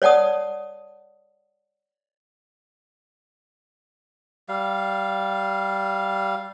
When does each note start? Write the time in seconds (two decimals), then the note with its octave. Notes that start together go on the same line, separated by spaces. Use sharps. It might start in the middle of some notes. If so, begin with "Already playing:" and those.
0.02 C#5 D5 F#5 A5 D#6
4.49 G3 F5